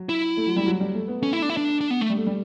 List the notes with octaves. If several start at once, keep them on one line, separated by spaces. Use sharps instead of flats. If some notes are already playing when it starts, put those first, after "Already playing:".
Already playing: F#3
E4
A3
F#3
G3
F#3
G3
A3
B3
A3 C#4
E4
D4
E4
D4
D4
B3
A3
G3
A3
G3